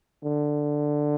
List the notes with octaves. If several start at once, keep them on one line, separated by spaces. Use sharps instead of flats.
D3